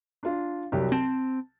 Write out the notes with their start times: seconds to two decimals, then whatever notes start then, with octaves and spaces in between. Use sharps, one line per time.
0.23 D4 F4
0.72 C2 F#3 G4
0.92 C4 A5